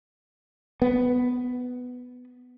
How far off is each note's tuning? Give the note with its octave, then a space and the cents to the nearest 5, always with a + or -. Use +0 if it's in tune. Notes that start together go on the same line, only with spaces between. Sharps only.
B3 +10